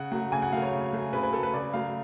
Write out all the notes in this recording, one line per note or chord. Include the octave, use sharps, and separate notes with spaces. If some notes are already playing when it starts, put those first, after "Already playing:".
Already playing: C#3 F#5
F#3 A3 F#5
C#3 G#5
F#5
F#3 A3 F5
C#5
C#3
F#3 A3
C#3 B4
B4
F#3 A3 A4
B4
C#3 D5
F#3 A3 F5